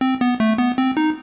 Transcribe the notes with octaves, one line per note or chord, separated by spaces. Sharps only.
C4
B3
A3
B3
C4
D#4